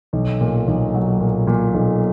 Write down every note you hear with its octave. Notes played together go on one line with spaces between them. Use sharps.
B1
A#2
B1
F#3
A#2
A#2
B1